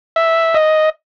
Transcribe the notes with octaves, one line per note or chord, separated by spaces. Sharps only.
E5
D#5